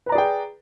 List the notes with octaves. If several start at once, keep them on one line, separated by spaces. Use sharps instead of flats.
G#4 B4 D5 G5 A#5